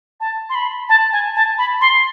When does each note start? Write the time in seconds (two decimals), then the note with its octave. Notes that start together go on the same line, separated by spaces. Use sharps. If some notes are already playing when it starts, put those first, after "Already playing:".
0.20 A5
0.49 C6
0.55 B5
0.89 A5
1.12 G#5
1.36 A5
1.58 B5
1.81 C6